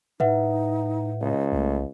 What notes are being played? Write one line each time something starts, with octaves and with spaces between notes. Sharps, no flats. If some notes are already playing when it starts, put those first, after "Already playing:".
A2 D#4 B4 E5 F#5
C#2 D#5
C2 A3